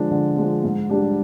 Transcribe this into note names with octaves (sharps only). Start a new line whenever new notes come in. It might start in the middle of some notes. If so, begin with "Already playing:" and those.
Already playing: D3 F3 G#3 D4
D3
F3 G#3 D4
G#2
G3 D4 G4